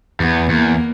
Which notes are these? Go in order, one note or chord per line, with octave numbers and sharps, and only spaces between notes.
E2 B3
E2 A#3